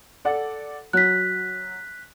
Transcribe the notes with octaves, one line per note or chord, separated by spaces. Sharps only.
A4 D5 F#5
F#3 F#6 B6